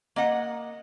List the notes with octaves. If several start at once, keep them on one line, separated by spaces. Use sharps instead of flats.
A#3 D#5 F#5